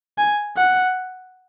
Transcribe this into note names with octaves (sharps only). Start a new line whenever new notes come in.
G#5
F#5